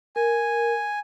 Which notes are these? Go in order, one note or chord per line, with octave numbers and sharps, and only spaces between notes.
A#4 G#5